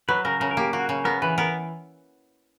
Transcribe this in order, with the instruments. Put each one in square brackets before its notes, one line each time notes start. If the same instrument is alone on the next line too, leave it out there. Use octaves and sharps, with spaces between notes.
[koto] F#3 [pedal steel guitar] B4
[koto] C#3 [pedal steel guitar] A#4
[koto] C#3 [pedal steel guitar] A#4
[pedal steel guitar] A#4
[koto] A#3 [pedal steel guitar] G4
[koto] A#3 [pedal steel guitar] F#4
[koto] C#3
[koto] B3 [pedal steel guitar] A#4
[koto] E3 [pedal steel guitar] B4
[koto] B3 [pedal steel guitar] A#4